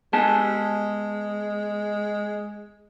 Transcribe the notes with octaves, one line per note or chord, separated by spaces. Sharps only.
G#3 B3 G#5 A5